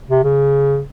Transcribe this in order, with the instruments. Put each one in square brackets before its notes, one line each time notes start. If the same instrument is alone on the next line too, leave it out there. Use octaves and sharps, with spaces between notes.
[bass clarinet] C3
C#3